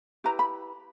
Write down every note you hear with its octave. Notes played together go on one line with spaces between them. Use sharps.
E4 G4 B4 A#5
B5